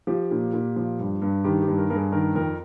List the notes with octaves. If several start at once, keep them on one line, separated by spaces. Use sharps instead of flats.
F3 G4
A#2
A#2
F3
G2
G2
D#3 G4
G4
G2
A#4
G2 A#4
G#4
D#3 A#4
F2 A#4